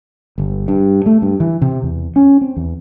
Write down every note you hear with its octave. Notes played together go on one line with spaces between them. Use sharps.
G1
G2
A3
G2
E3
C3
E2
C#4
C4
E2